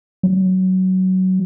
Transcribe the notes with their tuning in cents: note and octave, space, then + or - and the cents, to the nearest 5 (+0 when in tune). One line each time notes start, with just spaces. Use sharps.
F#3 +15